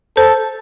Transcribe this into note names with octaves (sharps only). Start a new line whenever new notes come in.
A4 C5